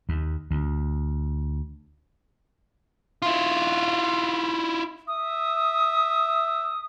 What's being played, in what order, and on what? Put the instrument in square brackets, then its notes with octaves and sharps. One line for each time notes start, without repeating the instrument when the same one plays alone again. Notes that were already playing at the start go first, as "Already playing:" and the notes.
[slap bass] D#2
D2
[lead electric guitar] E4 F4
[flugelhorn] E5 [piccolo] D#6